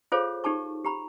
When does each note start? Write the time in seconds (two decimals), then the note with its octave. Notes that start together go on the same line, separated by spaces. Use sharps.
0.12 F4 G#4 A4 C5 C#5 F5
0.44 D#4 G4 A4 A5 C#6
0.85 G4 A#5 B5